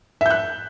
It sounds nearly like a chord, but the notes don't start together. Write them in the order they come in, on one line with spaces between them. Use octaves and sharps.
E5 G6 F#6